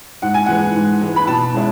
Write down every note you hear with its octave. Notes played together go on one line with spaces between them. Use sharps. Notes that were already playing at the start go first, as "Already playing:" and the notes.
G#2 F#5
G#5
E3 G#3 F#5
G#2
E3 G#3
B5
B2 A5
G#3 C#4 E4